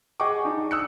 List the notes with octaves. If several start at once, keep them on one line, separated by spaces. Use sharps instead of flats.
G#4 D#5 F#5 G5 C#6 D6
D4 D#4 G#4
D#6 E6 F#6 C#7